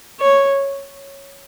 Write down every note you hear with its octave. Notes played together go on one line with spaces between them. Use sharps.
C#5